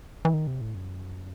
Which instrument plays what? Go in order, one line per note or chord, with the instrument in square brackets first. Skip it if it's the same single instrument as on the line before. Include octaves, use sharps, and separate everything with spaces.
[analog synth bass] E3
D#3
C3
A2
F#2